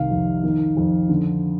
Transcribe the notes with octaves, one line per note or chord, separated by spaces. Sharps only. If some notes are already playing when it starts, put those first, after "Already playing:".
Already playing: C2 C3 D#3 F5
F2
D#3
F2
D3